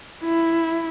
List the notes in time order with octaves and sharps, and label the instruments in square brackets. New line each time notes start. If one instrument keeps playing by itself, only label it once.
[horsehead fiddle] E4